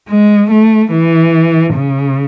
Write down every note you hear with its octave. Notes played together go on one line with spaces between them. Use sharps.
G#3
A3
E3
C#3